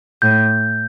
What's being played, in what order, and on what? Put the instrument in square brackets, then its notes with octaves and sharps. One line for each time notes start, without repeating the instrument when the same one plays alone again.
[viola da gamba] A2 [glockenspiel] G6